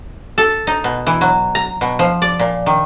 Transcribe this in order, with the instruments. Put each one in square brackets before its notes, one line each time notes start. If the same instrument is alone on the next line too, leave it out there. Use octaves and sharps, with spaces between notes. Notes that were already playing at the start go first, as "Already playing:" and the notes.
[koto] A4
D#4
B2
E3
F#3
A#5
B2
F3
D5
A#2
D#3